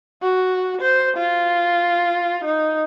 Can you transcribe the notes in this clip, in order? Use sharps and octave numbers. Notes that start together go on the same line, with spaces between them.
F#4
C5
F4
D#4